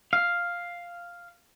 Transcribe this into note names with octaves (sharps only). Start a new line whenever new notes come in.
F5